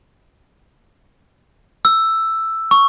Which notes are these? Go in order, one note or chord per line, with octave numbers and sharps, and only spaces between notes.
E6
C#6